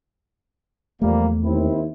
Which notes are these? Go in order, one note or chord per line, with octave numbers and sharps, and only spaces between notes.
E2 F3 G3 A3 A#3
D#2 C4 E4